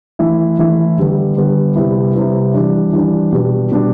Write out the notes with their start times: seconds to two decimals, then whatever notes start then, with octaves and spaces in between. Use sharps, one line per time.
0.19 E3 A3 E4
0.58 E3 A3 E4
0.98 D3 G3 B3
1.37 D3 G3 B3
1.76 C3 G3 B3 E4
2.15 C3 G3 B3 E4
2.54 E3 G3 D4
2.93 E3 G3 D4
3.32 B2 G3 B3 D4
3.72 B2 G3 B3 D4